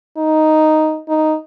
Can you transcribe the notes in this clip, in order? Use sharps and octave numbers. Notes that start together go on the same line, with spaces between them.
D#4
D#4